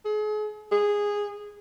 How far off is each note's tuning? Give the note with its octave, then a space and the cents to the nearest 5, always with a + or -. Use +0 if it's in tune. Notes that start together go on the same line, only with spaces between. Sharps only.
G#4 +40
G#4 -10